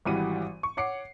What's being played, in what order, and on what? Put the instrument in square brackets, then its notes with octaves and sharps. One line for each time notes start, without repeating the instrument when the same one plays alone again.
[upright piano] G#1 E3 G3 F#4 D#7
C#6
C#5 F#5 D6 C7 C#7